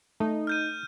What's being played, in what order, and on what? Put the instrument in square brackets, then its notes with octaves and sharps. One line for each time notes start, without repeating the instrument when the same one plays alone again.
[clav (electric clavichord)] A3 [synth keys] D#4
[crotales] F6 G6 D#7